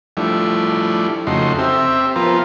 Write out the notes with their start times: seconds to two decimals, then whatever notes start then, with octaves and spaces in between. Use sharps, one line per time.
0.17 F3 G3 A3 D4 E4
1.27 F2 C#3 A3 D#4 F#4 C6
1.59 C4 G4 E5
2.16 F3 B3 F4 A#4 C5